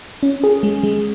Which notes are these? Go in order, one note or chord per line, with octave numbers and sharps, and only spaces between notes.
C#4
G#4
G#3
G#3